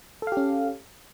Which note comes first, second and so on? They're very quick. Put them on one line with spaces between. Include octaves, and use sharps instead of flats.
A4 F5 G4 C#4